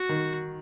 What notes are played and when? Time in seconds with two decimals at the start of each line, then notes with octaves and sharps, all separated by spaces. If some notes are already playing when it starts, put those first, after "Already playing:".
Already playing: F#4
0.09 D#3